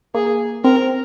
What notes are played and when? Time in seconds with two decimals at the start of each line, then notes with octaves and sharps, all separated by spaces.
0.15 A#3 G#4
0.64 C4 A#4